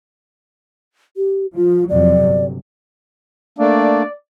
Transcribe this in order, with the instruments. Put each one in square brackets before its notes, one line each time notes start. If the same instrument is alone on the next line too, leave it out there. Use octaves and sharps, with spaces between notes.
[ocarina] G4
[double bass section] F3 [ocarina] F4
[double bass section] F2 C3 F#3 [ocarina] D5
[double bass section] G1
[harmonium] A3 A#3 D4 [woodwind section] D5